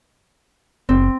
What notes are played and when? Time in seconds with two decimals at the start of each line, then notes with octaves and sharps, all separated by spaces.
0.89 F#1 C4